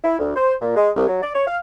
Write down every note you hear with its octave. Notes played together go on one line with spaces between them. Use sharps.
E4
D2
C5
A#2
G#3
C2
F#3
D5
C#5
F5